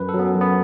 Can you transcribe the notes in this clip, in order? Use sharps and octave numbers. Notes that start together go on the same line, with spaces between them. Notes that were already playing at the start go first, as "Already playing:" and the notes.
Already playing: F#2 B4
A4
F#3
B3
C#4
F#2
B3